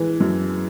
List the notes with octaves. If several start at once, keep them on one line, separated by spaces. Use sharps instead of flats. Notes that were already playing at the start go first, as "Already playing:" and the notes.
Already playing: E3 G#3
F#2